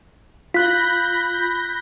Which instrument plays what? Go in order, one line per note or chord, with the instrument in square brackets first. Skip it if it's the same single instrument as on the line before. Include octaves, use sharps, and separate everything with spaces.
[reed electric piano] F4 [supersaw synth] B5 G6 A#6 [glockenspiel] F#6 B6